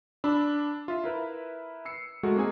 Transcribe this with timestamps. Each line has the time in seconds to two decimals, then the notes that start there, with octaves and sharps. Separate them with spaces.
0.24 D4 B5 E6
0.88 F4 E5
1.04 E4 A#4 B4 E5
1.85 E6 C7 C#7
2.23 G#3 A3 F#4 A4 A#4
2.36 A#3 C4 D#4 G#4 G#5